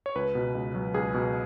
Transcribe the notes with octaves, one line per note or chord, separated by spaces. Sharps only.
C#5
C#2 B4
B2
C#2
F#3
C#2 G#4
B2